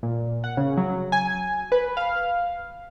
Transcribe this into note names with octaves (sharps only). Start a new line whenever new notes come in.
A#2
F#5
C#3
F#3
G#5
B4
F5